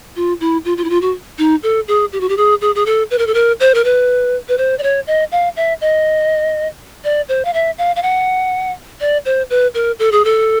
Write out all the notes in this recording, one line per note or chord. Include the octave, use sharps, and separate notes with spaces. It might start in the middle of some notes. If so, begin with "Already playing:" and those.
F4
E4
F4
F4
E4
F4
F#4
D#4
A4
G#4
G4
F#4
G4
G#4
G#4
G#4
A4
B4
A#4
A4
A#4
C5
A#4
B4
B4
C5
D5
C#5
D#5
F5
E5
D#5
D5
C5
F5
E5
F5
F5
F#5
D5
C5
B4
A#4
A4
G#4
A4